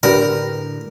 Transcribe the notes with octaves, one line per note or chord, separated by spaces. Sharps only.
A2 D3 D4 G4 A#4 B4